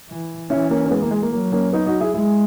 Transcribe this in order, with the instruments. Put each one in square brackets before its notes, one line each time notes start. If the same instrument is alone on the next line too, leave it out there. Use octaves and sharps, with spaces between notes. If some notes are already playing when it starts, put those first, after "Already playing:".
[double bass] E3
[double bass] E3 [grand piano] C#4 E4
[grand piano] A#3 C#4
C#4
G#3 B3
A#3
G#3
A#3
[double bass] F#3 [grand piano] A#3
[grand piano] A#3 C#4
B3 D#4
D#4 F#4
E4 G#4
[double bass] G#3 [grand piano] E4 G#4